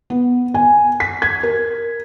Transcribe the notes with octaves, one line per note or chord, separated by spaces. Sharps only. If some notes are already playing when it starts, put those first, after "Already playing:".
B3
G#5
B6
G#6
A#4